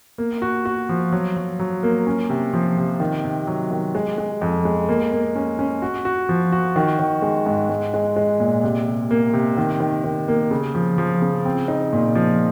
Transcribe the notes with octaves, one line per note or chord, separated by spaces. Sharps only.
A#3
F#4
F#4
F3
F#3
F#3
F#3
A#3
C#4
C3
F3
C3
D#3
C3
F#3
D#3
G#3
G#3
F2
G#3
A#3
A#3
C#4
C#4
F#4
F#4
F3
F#4
D#3
D#3
G#3
G#2
G#3
G#3
G#3
A#2
C3
C3
A#3
C3
D#3
D#3
D#3
A#3
C#3
F3
F3
C#3
C4
D#4
A#2
F3